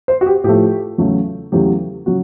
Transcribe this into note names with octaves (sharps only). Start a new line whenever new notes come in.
C5
F#4
G4
A2 F3 A3 G4
E2 C#3 F#3 A3
E2 C#3 F#3 A3 G4
C#3 F#3 F#4